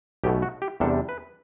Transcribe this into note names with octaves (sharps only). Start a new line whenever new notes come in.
B1 B2 A3 G4
F#4
G4
E2 C3 G3 D4 A4
B4